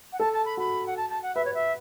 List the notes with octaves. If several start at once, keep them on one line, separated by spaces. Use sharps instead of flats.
F#5
A4 A5
A5
B5
F#4 B5
F#5
A5
A5
F#5
B4 E5
C#5
E5